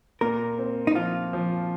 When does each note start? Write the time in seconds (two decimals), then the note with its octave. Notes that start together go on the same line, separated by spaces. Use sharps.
0.21 A#2 A#4
0.58 C4
0.87 D#4
0.95 F3 F4
1.33 F3